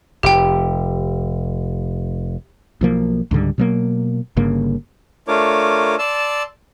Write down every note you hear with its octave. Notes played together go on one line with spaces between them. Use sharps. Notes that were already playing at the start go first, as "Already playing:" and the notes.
F1 G4 G5
B1 F3 A#3
C#2 G#2 D3 G3
B2 F#3 A#3
G1 G2 C#3 A#3
A3 D4 F4 A#4 C#5 D6
D5 A5 C6 E6